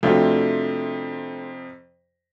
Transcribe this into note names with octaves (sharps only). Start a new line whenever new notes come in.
F2 C3 A3 D4 F4 F#4